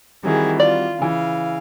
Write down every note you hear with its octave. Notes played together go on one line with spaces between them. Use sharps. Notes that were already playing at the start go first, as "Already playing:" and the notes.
D#3 E3 G3 C4 F#4 G#4
F4 D5
C#3 E3 F5